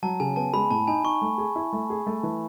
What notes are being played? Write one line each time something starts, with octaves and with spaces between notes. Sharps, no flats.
F#3 A5
C#3 G#5
B3 A5
G#3 B5
A2 A5
D#4 G#5
D#4 C#6
A3
G#4
E4
A3
G#4
A3
E3